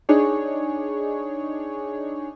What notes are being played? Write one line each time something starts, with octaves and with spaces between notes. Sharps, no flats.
D4 D#4 G#4 C#5